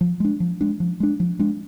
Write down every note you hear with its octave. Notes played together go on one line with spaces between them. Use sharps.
F3
G#3 D4
F3
G#3 D4
F3
G#3 D4
F3
G#3 D4